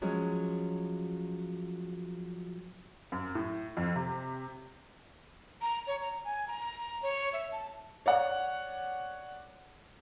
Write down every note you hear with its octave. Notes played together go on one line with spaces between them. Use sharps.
F3 F#3 G#3 C#4
F#2
A2
F2
C3
A#5
C#5
A#5
G#5
A#5
C#5
E5
A5
C#5 D5 F#5